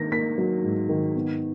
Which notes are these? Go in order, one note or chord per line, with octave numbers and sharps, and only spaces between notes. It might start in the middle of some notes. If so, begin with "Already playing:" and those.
Already playing: D#3 A#3 A#6
A#3 B6
F#3
G#2
D#3
B3